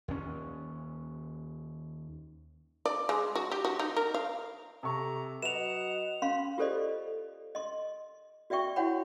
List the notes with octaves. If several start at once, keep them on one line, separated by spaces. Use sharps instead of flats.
D#2 C#4
D5
G#3
F#4
G4
F#4
D#4
A#4
F5
C3 A4 A#5 C#6
F#3 F#4 B4 D#5 F#5 E7 F7
C#4 F5 B5 C6
F4 G4 A4 C5 D5 D#5
D#5 C6
F#4 D5 E5 G5 C#6
E4 F#4 C#5 F#5 G5 B5